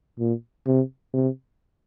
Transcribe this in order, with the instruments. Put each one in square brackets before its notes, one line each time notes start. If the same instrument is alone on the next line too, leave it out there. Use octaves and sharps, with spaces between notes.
[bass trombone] A#2
C3
C3